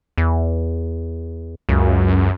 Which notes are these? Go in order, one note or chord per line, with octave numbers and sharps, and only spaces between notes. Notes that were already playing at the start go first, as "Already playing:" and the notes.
E2
C#2 F#2